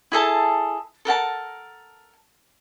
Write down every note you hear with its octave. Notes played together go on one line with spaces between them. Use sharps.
E4 G#4 A4 A5
A4 A#4 F#5 A5